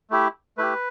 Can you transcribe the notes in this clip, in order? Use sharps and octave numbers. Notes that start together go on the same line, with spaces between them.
A3 E4 G4
A3 E4 G4 B4